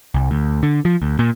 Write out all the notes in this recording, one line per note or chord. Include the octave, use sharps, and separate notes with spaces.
C2
D2
D3
F3
D2
A#2